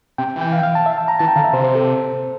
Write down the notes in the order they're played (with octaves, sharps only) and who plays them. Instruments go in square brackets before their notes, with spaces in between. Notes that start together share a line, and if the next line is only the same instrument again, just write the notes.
[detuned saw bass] C3 [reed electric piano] G5
[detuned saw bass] E3
[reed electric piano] G5
F5
G5
F5
A5
E5
A5
A#5
[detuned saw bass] E3 [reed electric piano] A5
[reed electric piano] G5
[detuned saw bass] D3 [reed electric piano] F5
[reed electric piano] E5
[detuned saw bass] C3 [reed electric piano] C5
[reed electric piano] C5
A4